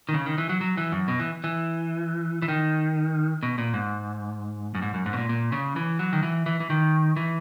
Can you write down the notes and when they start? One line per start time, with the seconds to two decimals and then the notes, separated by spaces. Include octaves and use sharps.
0.09 D#3
0.14 C#3
0.26 D#3
0.38 E3
0.49 F#3
0.61 F#3
0.77 E3
0.92 F#2
1.08 B2
1.19 E3
1.44 E3
2.42 E3
2.48 D#3
3.43 B2
3.58 A#2
3.74 G#2
4.75 F#2
4.82 G#2
4.94 F#2
5.06 G#2
5.13 B2
5.17 A#2
5.29 A#2
5.52 C#3
5.76 E3
5.99 F#3
6.13 D#3
6.23 E3
6.46 E3
6.60 E3
6.70 D#3
7.16 E3